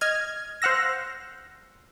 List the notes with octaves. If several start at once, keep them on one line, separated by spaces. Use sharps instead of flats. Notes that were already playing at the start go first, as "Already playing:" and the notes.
D#5 F6 G#6
C5 F5 F#5 E6 A#6